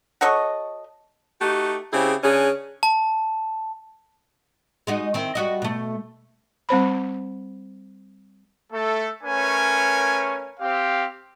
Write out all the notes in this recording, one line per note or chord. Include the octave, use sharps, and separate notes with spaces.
F#4 A4 C#5 D#5
A3 D#4 F#4 G4
C#3 C4 E4 G4 G#4
C#3 C#4 D4 G#4 C#5
A5
G#3 D#4 F#4
D#3 C4 E4
G3 F#4 D#5
B2 A3
G3 C4 C5 B5
A3 A4
A3 C#4 A#4 B4 C#5 G#5
C4 G4 F5